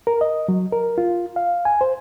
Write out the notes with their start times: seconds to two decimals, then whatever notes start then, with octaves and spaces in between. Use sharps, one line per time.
0.07 A#4
0.21 D#5
0.49 F#3
0.72 A#4
0.98 F4
1.36 F5
1.65 G#5
1.81 C5